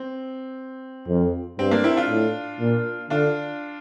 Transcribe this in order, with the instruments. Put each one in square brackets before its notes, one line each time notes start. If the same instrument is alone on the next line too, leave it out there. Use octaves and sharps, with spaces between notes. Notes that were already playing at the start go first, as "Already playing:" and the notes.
Already playing: [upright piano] C4
[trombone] F2
[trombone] G2 [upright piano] C4
[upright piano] A#3 D4
C4 E4
D4 F4
[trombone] A2
A#2
[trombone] D3 [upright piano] D4 F4